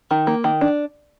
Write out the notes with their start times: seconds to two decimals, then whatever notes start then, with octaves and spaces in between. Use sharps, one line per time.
0.11 D#3
0.27 A#3
0.44 D#3
0.61 D4